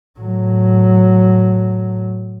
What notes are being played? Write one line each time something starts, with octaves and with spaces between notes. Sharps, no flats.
A2 F#3